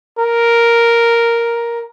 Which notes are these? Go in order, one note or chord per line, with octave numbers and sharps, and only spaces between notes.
A#4